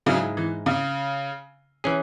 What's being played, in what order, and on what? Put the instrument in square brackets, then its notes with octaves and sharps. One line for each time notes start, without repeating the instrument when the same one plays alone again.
[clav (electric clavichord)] G#2 G#3 E4 G#4 [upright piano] C#3 F#3
[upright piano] E3
C#3
[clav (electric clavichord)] E3 C#4 G#4